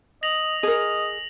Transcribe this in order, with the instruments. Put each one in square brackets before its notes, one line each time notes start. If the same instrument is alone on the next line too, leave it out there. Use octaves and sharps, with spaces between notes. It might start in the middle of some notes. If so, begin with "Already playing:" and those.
[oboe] D#5 [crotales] A#6 F7 F#7
[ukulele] G#4 A#4 [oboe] D#5